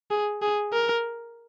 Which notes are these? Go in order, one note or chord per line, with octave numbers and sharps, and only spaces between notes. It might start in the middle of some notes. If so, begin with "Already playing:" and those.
G#4
G#4
A#4